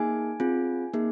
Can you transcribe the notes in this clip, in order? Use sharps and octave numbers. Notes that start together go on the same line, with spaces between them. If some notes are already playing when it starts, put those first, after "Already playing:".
Already playing: A#3 D#4 G#4 G#5
C4 F4 G#4
A#3 D#4 G#4